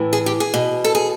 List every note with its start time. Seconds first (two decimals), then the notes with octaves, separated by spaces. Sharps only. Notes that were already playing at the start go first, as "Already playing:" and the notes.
Already playing: A2 E3
0.13 G#4
0.26 G4
0.40 G#4
0.54 B2
0.84 A4
0.95 G#4